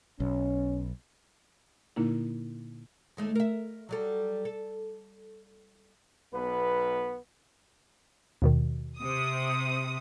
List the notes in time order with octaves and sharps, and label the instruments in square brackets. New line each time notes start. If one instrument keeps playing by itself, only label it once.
[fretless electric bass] B1 [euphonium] C#4
[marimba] A#2 D3 A#3 D#4 E4
[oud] D#2 G#3 A3
A#4 E5
F#3 G3 A4
A4
[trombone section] B1 B3 B4
[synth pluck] D#2 B2 D#3
[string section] C3 D#6